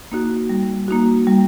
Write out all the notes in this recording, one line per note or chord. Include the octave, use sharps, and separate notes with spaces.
A#3 D#4 F#4
G3
A#3 D#4 F#4
G3